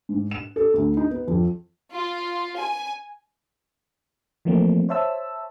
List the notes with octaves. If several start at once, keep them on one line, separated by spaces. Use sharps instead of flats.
G#2
E7
A4
D2
D#4
B3
F2
F4
G#5
E3 F3 A3 A#3 C4
C5 C#5 E5 A5 E6